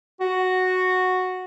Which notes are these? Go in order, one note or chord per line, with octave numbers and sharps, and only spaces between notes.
F#4